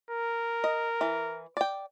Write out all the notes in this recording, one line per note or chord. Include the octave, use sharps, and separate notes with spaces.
A#4
D#5
E3
D5 G5